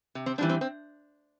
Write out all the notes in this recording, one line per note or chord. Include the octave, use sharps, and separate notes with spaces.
C3
C4
E3 G3 C4 D4
C4
C4